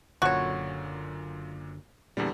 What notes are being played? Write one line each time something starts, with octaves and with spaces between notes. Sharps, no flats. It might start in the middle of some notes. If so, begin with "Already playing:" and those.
F#1 F#2 A#2 D3 F#4 C#5
E2 A#2 D3 G3